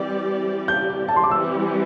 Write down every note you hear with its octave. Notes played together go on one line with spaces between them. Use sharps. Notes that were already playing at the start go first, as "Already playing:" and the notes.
Already playing: E3 G3 C4 G4 D5
G6
A5
C6
D6
E3 G3 C4 G4 E6